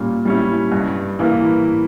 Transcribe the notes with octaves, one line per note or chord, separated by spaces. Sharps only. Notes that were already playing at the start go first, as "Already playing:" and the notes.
Already playing: A#2 G3 C#4
G3 C#4 E4
G2
E3 A#3 E4